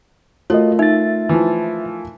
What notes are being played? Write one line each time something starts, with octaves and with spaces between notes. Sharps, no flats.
A3 F4 F#4 A#4 C#5 D#5
D#4 E5 A6
E3 F3